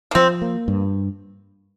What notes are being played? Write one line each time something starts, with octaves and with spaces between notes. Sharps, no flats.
A#3
F3 C4
A#3
G2